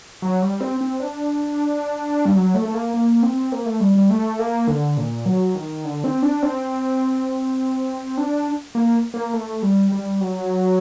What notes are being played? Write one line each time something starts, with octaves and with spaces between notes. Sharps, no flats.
F#3
G3
C4
C4
D4
G3
F#3
A3
A3
A#3
A#3
C4
A#3
A3
G3
G3
A3
A#3
D3
A#2
F#3
D#3
D3
C4
D4
C4
D4
A#3
A#3
A3
G3
G3
F#3